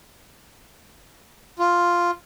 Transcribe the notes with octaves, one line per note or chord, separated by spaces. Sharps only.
F4